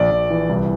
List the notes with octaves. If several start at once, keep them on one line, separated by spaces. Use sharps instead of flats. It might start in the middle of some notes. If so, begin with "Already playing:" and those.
Already playing: A#1 D5
A#1
E3
C2